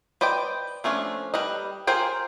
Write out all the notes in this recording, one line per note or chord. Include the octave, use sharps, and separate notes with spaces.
B4 C5 D5 D#5 G5
F3 A3 C#4 D4
G3 B4 D#5
F4 G#4 A#4 C5 G5